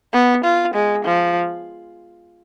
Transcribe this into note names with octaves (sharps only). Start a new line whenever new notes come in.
B3
F4
G#3
F3